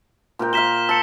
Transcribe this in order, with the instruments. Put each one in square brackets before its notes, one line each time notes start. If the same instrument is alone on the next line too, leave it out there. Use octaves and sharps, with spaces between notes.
[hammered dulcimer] A#2 A#4 G5
[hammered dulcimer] A#4 F5 [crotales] B6 E7 G7
[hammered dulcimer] A5 [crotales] E6 C#7